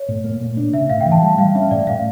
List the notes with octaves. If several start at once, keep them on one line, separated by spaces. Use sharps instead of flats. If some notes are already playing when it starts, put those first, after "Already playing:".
Already playing: C#5
A2
A#3
A#2
D4
C#3 E5
A2 F5
G5
E3
A5
G3 G5
G3 F5
C#4 E5
A2 D5
A2 F5